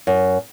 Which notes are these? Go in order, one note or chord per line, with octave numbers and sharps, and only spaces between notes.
F#2